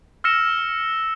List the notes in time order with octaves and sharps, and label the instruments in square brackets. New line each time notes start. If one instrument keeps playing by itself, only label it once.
[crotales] E6 F6 A#6 C#7 E7